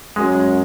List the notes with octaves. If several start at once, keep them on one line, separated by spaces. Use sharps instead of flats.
F#2 G#3